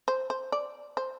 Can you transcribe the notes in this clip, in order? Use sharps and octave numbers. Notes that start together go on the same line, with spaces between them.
C5
C5
D5
C5